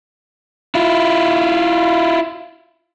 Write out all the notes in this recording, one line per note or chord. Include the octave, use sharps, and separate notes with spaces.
E4 F4